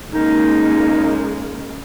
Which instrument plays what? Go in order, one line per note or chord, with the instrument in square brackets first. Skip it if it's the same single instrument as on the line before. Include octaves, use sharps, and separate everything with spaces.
[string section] C#3 G#3 A#3 [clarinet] D#4